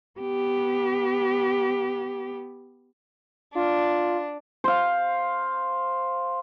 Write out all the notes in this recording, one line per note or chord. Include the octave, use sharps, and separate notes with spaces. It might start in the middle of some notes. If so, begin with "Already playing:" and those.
B3 G4
D4 F4
C5 F5